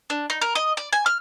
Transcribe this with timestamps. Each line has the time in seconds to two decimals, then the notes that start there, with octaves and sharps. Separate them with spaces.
0.10 D4
0.30 D#4
0.41 A#4
0.55 D#5
0.77 D5
0.92 G#5
1.06 F6